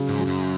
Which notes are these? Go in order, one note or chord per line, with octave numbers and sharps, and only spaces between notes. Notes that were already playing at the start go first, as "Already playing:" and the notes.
Already playing: C#3 F#3
G#2
F#3
F#2